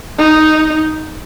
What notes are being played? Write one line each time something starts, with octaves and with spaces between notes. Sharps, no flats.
D#4